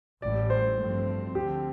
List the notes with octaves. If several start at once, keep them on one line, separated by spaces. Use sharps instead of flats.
A1 A2 G3 D5
C5
G2 F3 A3 C4
D2 D3 F3 C4 G4